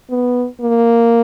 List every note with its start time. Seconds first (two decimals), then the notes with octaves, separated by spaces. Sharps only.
0.11 B3
0.61 A#3